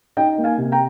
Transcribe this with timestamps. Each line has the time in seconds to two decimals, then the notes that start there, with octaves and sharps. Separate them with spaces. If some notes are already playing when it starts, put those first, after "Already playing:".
0.17 D#4 D#5 G5
0.38 A#3
0.44 F5 G#5
0.58 C3
0.72 G5 A#5